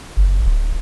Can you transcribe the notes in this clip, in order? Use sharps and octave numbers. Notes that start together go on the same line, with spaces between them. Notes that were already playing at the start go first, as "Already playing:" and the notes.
F#1
D1